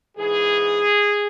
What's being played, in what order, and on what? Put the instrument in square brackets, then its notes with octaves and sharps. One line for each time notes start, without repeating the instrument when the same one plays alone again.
[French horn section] G#2 E3 G#4